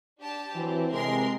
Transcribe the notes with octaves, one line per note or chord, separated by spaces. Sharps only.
D4 G4 A5
E3 F#3 C4
C3 G#3 A#4 C6 C7